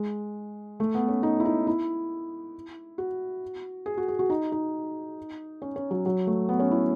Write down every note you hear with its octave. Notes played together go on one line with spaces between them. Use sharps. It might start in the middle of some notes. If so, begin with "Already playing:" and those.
Already playing: G#3
A3
B3
C#4
D#4
E4
D#4
E4
F#4
G#4
F#4
G#4
F#4
D#4
D#4
C#4
C#4
F#3
F#3
A3
B3
C#4
E4